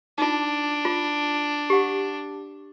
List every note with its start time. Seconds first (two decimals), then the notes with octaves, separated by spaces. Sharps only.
0.18 D4 D#4 F4
0.85 F4
1.70 G4 F#5